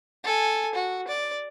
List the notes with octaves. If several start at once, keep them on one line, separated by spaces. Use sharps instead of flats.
A4 G#5
F#4
D5